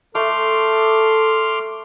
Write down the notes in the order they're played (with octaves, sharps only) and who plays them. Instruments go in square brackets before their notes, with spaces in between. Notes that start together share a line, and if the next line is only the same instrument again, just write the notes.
[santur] A3 [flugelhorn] A4 [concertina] C6 D6 F6